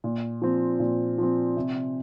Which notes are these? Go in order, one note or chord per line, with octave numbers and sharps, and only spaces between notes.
A#2
F3 C4
A#2
F3 C4
C3